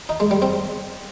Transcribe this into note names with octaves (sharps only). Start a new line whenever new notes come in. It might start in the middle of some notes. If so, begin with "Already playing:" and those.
D#4
G#3
G3
C4